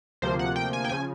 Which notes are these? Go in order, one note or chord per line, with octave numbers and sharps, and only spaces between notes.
D2 C3 F3 A#3 C5
F#5
G5
G#5
G5
C#3 F3 G#5